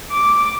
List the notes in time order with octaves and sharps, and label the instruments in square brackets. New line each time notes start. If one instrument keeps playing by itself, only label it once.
[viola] D6